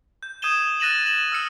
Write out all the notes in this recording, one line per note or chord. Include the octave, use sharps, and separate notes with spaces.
G6
D#6 G6 G#6 D#7 E7 G7
F#6 A6 A#6 D#7 E7 F#7
E7 F#7
E6 F6 C#7